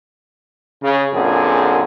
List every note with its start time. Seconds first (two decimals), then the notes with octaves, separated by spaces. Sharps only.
0.82 C#3
1.14 F#2 A#2 D3 C4 G#4